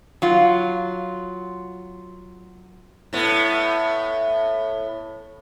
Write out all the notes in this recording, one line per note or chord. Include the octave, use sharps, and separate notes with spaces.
F#3 F4
A2 B3